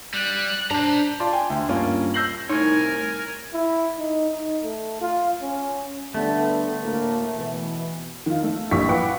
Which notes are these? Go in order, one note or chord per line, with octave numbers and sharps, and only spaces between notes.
G3 F#6
D4 C5 A#5
F4 D5 A5 C6
G5 G#5 C6
D2
G2 A#3 C#4 F4
E6 G6 A#6 C7 F#7
C2 A2 D#4 A#4 C#5 G#5
E4
D#4
D#4
A3
F4
C#4
D3 G3 A3 B3
D2 A2 A#3
B2 E3
D#3 F4
A3
A1 G2 A#2 G4 C#6 B6
F4 B4 F#5 G5 D6